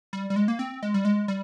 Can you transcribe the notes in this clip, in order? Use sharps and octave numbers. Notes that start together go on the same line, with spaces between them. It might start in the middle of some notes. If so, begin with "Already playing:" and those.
G3
G3
G#3
A#3
C4
G#3
G3
G#3
G3